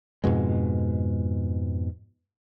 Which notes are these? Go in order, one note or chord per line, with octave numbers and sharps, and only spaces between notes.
F2 G#2 B2 G#3